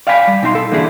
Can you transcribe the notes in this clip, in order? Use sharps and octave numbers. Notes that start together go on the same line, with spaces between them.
D5 F5 G5 G#5 B5
G3
B2 D#4 E5 C6
A4
D3 E3 A#3 E4 G#4